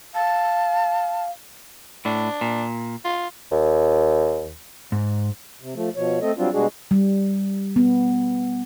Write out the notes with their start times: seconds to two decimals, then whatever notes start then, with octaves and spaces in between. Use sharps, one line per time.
0.15 F5 A5
2.05 A2 D4
2.41 A#2
3.05 F4
3.52 D#2
4.92 G#2
5.61 C3
5.75 F3 A3
5.96 B2 F3 C#5
6.21 A3 C4 A4 D#5
6.38 F#3 G3 C4 D4 F4
6.53 B2 G3 G#3 D4 F#4 G#4
6.91 G3
7.76 B3